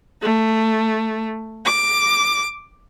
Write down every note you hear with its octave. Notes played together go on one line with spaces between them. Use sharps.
A3
D6